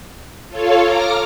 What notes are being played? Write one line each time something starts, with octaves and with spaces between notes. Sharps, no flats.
F4 A4 C#5 F5
A#5 D6 F6 A#6